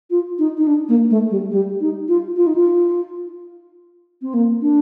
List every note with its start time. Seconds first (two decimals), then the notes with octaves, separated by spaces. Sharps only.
0.10 F4
0.39 D#4
0.58 D#4
0.67 D4
0.89 A#3
1.10 A3
1.30 G3
1.52 G3
1.80 D#4
2.08 F4
2.36 F4
2.47 D#4
2.55 F4
4.22 C4
4.34 A#3
4.61 D4